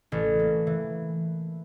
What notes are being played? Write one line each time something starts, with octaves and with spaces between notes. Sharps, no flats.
A1
A#3
E3